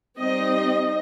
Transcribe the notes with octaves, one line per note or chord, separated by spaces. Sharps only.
G3 C4 D#4 D#5